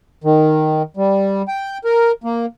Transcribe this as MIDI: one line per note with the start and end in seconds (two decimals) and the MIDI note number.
0.24 0.82 51
0.97 1.42 55
1.48 1.78 79
1.84 2.12 70
2.24 2.46 58